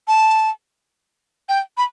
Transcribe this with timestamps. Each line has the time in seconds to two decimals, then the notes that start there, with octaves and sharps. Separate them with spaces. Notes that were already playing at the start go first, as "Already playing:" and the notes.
0.08 A5
1.49 G5
1.77 B5